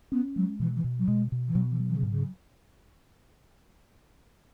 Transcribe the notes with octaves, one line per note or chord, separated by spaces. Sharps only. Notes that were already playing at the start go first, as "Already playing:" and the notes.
B3 C#4
F#3 G#3
B2 E3
E3
B2
F#3
B2 G#3
B2
E3
B2 F#3
E3
F#3
E3
C#3
G#2
C#3